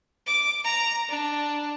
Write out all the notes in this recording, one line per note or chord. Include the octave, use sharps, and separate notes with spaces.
D6
A#5
D4